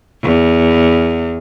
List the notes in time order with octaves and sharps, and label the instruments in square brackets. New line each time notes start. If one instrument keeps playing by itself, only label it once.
[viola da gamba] E2